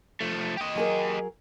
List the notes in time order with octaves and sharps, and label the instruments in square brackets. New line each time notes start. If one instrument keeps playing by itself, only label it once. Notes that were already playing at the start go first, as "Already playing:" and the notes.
[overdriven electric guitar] F3 A3
G4 D#5
[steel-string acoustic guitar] F#3 G#4 A#4